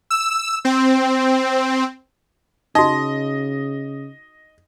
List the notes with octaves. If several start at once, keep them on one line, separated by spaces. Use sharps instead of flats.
E6
C4
C#3 D#4 F#4 D#5